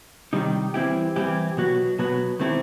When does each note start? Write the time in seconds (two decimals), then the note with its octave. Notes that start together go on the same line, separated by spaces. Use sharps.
0.33 C3 D#3 G3 D#4
0.74 E3 G3 C4 E4 G4
1.16 E3 G3 C4 E4 G4
1.57 B2 F#3 B3 F#4
1.99 B2 F#3 B3 F#4
2.40 D#3 A3 C4 E4 G4